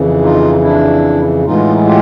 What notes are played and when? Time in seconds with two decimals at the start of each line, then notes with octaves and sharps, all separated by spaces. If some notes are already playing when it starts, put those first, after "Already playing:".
Already playing: F2 C#3 E3
0.22 D#4 F4
0.63 D4 E4
1.45 A2 E3 G#3 B3 D#4 F4
1.86 F4 G4